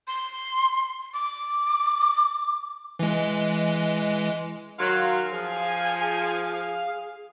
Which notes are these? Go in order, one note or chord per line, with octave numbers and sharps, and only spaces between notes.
C6
D6
E3 G#3
D#3 F#3 F5 C6
F3 G#4 G#5